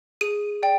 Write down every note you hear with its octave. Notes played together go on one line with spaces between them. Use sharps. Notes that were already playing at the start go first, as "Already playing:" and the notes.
G#4 D#7
D5 G5